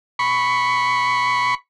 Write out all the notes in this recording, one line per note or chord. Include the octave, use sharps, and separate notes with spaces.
B5 C#6